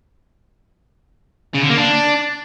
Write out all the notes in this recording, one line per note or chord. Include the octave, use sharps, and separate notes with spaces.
C#3
D3
A#3
D4